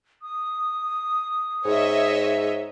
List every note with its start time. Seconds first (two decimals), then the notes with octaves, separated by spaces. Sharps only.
0.22 D#6
1.65 G#2 C#5 D#5 E5